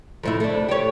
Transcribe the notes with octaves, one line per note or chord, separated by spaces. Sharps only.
F2 A2 E4
A3 D4
G4 C#5